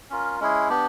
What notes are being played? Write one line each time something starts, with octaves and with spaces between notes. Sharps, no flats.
C#4 F4 A#4
G#3 C#4 E4 G#4
B3 D4 G4